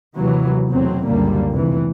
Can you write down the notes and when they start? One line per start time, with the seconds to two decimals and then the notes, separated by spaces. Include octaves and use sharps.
0.17 D#2 C3 E3 F#3
0.68 E2 B2 F#3 A3 C4
1.06 C#2 F#2 A#2 D3 G3 A#3
1.51 F1 C3 E3